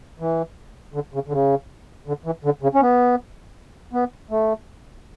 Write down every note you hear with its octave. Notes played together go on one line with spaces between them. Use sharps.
E3
D3
C#3
D3
C#3
D3
E3
D3
C#3
C#4
B3
B3
A3